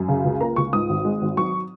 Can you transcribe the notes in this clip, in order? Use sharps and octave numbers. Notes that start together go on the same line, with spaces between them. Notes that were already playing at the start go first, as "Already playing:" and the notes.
Already playing: F#2
C#3
C#2
A#3 A#5
C#2 C#6
G#2 D#6
G#1
G#3
G#1
F#3 C#6